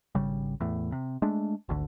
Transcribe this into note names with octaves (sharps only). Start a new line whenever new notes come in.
G#1 C#3 G3
E2 A2
C3
G#3 A3 D4
G#1 D2 D3